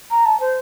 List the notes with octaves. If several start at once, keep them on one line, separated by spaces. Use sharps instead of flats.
A#5
A5
C5